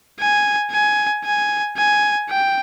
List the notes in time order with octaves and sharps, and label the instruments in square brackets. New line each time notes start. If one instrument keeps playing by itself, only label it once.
[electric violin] G#5
G#5
G#5
G#5
G5